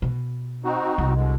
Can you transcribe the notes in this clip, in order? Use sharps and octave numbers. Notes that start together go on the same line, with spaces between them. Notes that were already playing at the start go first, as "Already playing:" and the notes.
B2
C4 D#4 F#4
C2
B2 D3 G#3